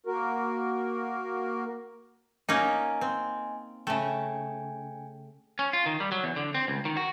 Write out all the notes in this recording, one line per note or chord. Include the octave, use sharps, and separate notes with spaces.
A#3 F#4 A#4
A#3 C#4 D#4 D#5 G#5
C4
C#3 A3 G5 G#5
C#4
F4
D#3
G3
F#3
E2
D3
C4
C#2
D#3
F#4